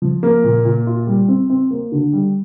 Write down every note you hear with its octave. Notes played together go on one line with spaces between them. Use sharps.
F3
A#3
A#2
A#2
F4
G3
C4
C4
A#3
D3
G3